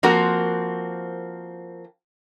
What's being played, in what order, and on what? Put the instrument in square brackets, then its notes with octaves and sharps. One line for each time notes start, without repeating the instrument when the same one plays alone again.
[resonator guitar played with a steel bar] F3 A#3 C4 F#4 A#4